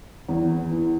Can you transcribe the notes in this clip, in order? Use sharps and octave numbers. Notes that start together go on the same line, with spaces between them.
E2
E3